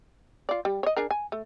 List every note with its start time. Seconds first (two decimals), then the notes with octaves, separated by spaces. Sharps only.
0.49 F4 D5
0.65 G3
0.83 C#5 D#5
0.97 D4 G#4 A#4
1.11 G#5
1.32 A3